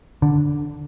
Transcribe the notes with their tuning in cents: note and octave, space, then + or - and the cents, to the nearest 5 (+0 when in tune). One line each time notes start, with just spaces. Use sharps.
D3 +0